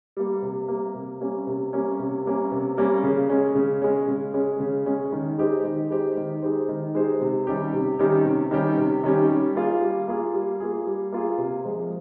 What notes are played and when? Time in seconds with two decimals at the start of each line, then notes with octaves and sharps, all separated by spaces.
0.17 G3 A#3
0.42 C3
0.68 G3 A#3
0.94 C3
1.21 G3 A#3 C#4
1.47 C3
1.73 G3 A#3 C#4
1.99 C3
2.25 G3 A#3 C#4
2.51 C3
2.77 G3 A#3 C#4
3.03 C#3
3.29 G#3 C#4
3.55 C#3
3.82 G#3 C#4
4.08 C#3
4.34 G#3 C#4
4.60 C#3
4.86 G#3 C#4
5.12 D#3
5.38 G#3 D#4 G4 C5
5.64 D#3
5.90 G#3 D#4 G4 C5
6.17 D#3
6.42 G#3 D#4 G4 C5
6.69 D#3
6.95 G#3 D#4 G4 C5
7.21 C3
7.47 D#3 G3 C#4 G4
7.73 C3
7.99 D#3 G3 C#4 G4
8.25 C3
8.51 D#3 G3 C#4 G4
8.77 C3
9.04 D#3 G3 C#4 G4
9.29 G3
9.56 A#3 F4 G#4
9.81 G3
10.08 A#3 F4 G#4
10.34 G3
10.60 A#3 F4 G#4
10.86 G3
11.12 A#3 F4 G#4
11.38 C3
11.65 F3 G#3